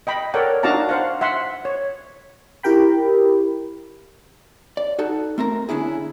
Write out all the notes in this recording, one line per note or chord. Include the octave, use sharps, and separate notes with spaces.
D#5 G5 B5
A4 A#4 C#5 D5 F#5 G5
D4 D#4 F#4 F5 A5 A#5
C5 F5 F#5
E5 F#5 C6
C#5
E4 G4 A#4 G5 B5
D5
D#4 F#4 A4
A3 C4 A#4 A#5
D3 C#4 D4 E4 G#4